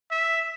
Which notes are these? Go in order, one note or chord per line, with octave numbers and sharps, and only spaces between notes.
E5